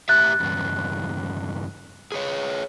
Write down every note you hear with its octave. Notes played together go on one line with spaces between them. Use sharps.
A2 G4 E5 F#6 A6
E2 G2 C#3
G#4 B4 C#5